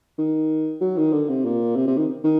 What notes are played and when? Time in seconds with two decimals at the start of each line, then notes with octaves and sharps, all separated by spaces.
0.18 D#3
0.81 F#3
0.97 D#3
1.13 D3
1.29 C3
1.45 A#2
1.76 C3
1.87 C3
1.97 D#3
2.24 D#3